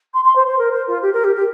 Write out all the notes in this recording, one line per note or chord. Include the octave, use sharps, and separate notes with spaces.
C6
C6
C5
C5
A#4
C5
F4
G4
A#4
G4
G4